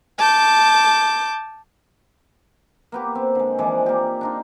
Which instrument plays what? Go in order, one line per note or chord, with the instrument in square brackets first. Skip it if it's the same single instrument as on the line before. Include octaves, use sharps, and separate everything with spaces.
[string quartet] A5 D6 G6
[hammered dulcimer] A#3 B3 G4
C4
D3 G#3
E3 F3 G#3 D5
A#3 G4
D4 D#4 F4